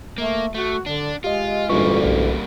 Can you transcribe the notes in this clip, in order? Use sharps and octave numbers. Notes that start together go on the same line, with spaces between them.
A3 A#3
A3 F#4
D3 D4
G#3 F4 G4 D#5
A1 D2 G2 G3 A#3 F4 B4 C#6
B1